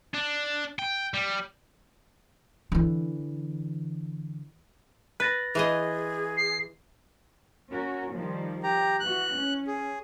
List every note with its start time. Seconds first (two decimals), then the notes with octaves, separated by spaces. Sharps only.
0.14 D4
0.79 G5
1.14 G3
2.72 D3 E3
5.20 B4 F#6 A6 A#6
5.55 E3 G#4 C5 D#5
6.37 C7
7.70 C#4 F#4 A#4
8.14 D#3 F3 G3
8.63 G4 A#5
9.00 E3 F#4 F#6
9.35 C#4
9.67 G#4